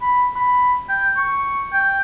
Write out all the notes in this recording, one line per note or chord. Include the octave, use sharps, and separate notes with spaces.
B5
B5
G5
C#6
G5